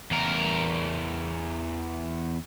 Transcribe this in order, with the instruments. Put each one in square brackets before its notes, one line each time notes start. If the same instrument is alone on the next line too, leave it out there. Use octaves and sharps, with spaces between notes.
[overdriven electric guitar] E2 A#4